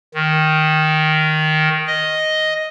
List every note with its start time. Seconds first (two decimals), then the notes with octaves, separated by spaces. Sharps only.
0.14 D#3
1.87 D#5